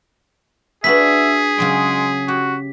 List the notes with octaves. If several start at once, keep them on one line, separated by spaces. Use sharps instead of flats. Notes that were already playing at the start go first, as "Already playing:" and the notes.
D4 F#4 G#4 B4 E5 B6
C#3 F#3 G#3 G5
F#4 G4